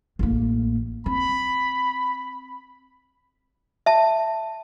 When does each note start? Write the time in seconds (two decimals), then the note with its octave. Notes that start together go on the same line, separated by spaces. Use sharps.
0.19 A1 A#3
1.06 C4 B5
3.86 E5 A5